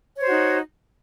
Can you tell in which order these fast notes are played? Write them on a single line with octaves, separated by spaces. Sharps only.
C#5 C5 F#4 D#4